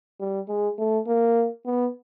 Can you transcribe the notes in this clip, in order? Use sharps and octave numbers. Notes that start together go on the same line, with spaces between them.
G3
G#3
A3
A#3
B3